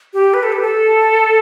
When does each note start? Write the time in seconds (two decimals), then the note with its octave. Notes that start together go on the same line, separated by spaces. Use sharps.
0.13 G4
0.34 B4
0.43 A4
0.52 G4
0.62 A4